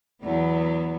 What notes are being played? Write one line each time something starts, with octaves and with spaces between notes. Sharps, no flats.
E2 F#3 B3